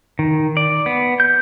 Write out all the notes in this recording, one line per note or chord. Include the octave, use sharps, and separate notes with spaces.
D#3
D5
B3
G6